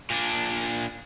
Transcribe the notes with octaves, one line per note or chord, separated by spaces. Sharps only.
A#2 D4